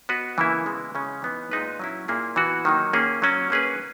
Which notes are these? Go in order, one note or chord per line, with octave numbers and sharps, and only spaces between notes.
B3 F#4 B4 D#5
C#3 E3 A#3 E4
C#3 G#3 B3
C#3 G#3 C#4
E3 B3 D#4
A#2 G#3 D#4 G#4 B4
F#3 C#4 E4
A#2 A#3 E4 G#4
E3 B3 F#4
D#3 F#3 A#3 D#4
A#3 C#4 G#4
F#3 C#4 F#4
A#3 C#4 G#4 B4